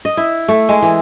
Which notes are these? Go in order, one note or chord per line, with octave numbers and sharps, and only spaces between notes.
D#5
E4
A3
G#3
E3